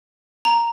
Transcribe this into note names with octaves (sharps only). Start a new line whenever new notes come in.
A#5